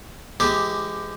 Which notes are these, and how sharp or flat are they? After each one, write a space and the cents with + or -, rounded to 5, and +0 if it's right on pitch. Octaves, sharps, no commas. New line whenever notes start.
E3 +40 G#3 +15 G4 +0